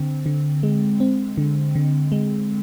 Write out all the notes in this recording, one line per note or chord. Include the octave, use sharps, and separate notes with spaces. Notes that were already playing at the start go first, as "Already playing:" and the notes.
Already playing: D3 C4
D3
G#3
C4
D3
D3
G#3